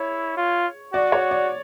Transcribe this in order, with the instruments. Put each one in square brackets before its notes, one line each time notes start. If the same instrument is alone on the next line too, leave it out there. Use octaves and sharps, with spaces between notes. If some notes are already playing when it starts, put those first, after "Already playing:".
Already playing: [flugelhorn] E4 [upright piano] C#5
[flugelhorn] F4
[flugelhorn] F#4 [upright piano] D5
[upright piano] C#5
D5